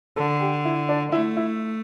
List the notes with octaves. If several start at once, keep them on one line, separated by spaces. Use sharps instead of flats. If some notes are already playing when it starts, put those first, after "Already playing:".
D3 A4
G4
E4
D4
A3 E4
E4